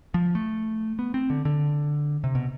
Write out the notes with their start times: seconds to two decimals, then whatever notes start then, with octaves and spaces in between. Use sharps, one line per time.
0.14 F3
0.35 A3
0.99 B3
1.14 C4
1.30 D3
1.45 D3
2.24 C3
2.35 B2